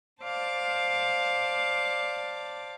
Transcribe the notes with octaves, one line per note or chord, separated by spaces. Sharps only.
C5 D5 F5 A5 D6